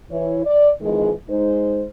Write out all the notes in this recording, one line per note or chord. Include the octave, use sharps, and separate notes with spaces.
E3 E4 C#5
D5
F2 D#3 E3 G#3
G#3 D#4 C5